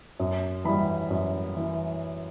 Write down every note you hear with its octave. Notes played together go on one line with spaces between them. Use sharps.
F#2
E3 G3 B5
F#2
E3